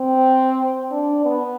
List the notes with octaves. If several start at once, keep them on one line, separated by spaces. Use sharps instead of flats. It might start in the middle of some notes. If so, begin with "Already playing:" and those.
Already playing: C4
D4
B3